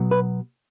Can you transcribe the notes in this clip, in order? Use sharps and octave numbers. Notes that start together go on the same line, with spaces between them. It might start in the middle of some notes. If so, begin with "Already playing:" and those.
Already playing: B2 F#3 B3
B4